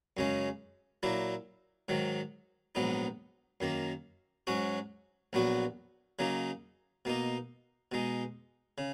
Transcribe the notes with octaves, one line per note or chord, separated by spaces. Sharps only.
F#2 C#3 G#3 C#4
A#2 F#3 A#3 E4
G#2 D#3 F#3
A#1 G#2 F#3 B3 D#4
F#2 D#3 A#3
G#2 F#3 C#4 F#4
A#1 A#2 F#3 B3 F#4
C#3 F#3 A#3 D#4
B2 A#3 D#4
B2 G#3 D#4
C#3